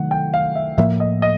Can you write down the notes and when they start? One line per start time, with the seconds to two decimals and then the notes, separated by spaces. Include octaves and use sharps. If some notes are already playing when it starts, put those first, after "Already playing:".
Already playing: C3 D#3 F#3 A3 F#5
0.11 G5
0.34 F5
0.55 E5
0.78 A2 F3 A#3 E5
1.00 D#5
1.22 D#5